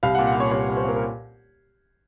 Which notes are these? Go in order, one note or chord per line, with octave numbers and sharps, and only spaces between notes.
C2 F5
F#5
A#2
F#5
A#2
C#5
C2 C#5
C2
C5
A#2 A#4
A#4